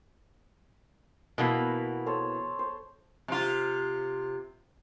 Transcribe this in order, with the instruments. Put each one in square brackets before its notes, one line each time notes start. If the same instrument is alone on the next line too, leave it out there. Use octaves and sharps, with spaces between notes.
[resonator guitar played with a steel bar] B2 E3 A#3 [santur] B3 B4 E6
[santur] A4 C5 C#5
C5
[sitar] C3 F4